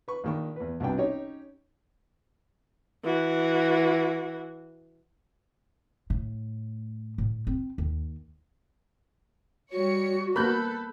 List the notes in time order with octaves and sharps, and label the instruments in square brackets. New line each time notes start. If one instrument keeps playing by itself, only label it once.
[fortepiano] B4 C#6
A#1 D#3 C#6
E2 B4
C2 B2 B3 D4 G5
C#4 D#4 G4 C#5
[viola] E3 F#4
[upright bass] A2
A2
C4
D#2
[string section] G3 C#5 C#7 [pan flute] F#4
[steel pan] A#3 B3 A#4 [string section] A4 [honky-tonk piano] B5 F#6 G6